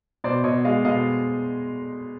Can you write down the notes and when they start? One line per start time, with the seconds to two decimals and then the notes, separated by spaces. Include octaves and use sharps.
0.24 B2 C5 D5
0.44 B2 C#5 D#5
0.65 G#3 D#5 F5
0.85 B2 D#5 F5